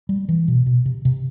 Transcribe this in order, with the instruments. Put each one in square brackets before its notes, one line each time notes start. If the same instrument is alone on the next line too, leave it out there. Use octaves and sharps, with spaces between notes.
[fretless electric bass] G3
E3
B2
B2
C3
C3